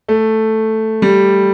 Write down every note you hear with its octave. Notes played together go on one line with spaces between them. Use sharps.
A3
G3